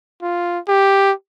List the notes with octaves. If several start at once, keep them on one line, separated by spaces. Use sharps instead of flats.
F4
G4